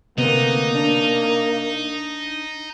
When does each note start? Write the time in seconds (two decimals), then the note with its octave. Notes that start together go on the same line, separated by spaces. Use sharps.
0.18 D2 C3 A#3 B3 D#4
0.74 D4